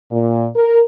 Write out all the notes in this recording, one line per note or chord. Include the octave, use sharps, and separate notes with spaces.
A#2
A#4